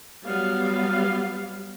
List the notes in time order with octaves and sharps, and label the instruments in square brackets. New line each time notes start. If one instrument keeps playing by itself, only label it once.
[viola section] F#3 G3 B3 F5